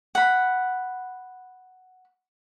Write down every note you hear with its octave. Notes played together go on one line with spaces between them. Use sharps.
F#5 B5